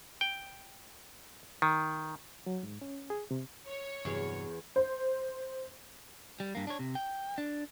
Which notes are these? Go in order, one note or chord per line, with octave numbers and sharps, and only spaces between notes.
G5
D#3
F#3
G#2
C#4
G#4
C3
C#5
E2 G2 C3 F#3
C5
G3
G2 A#3
D4 C#5
C3
G5
D4